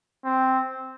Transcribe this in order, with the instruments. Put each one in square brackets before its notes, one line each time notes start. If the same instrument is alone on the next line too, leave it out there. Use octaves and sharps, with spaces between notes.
[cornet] C4